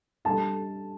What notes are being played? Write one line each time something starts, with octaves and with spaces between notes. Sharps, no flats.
G3 D4 A4 A5